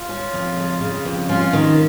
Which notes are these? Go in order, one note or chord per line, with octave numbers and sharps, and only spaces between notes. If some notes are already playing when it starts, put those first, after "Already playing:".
Already playing: F4
C#4
F2
C#3
C#3
F2
C#4 F4
D#3